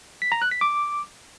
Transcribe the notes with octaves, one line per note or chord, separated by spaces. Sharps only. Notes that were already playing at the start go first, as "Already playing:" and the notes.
B6
A#5
F#6
B6
D6